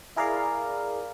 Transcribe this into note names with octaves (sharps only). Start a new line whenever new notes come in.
E4 G#4 A#4 D5 F5